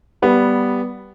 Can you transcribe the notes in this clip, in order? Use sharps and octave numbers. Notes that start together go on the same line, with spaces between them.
G3 B3